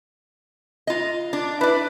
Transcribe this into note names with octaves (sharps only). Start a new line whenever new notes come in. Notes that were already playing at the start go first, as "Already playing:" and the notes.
F4 D#5
D4
E4 B4 D5